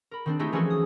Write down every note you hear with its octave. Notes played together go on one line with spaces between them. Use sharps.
A#4 B5
D#3 C4 D4
G#3 A3 D#4 E4 G4
E3 F3 C#4 F#4 G#4 A4
D#6